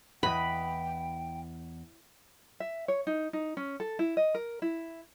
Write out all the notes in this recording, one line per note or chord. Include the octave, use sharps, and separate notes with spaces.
E2 B4 D#5 G5 B5
E5
C#5
D#4
D#4
C#4
A4
E4
D#5
A#4
E4